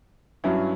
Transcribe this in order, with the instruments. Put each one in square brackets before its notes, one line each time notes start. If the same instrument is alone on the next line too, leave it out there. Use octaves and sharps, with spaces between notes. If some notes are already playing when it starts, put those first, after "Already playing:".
[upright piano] G2 F#3 C#4 E4